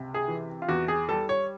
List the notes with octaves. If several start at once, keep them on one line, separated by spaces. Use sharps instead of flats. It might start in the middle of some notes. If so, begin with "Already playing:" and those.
Already playing: C#2 C3
G#4
E3
F4
E2 F#4
G#4
G3 A4
C#5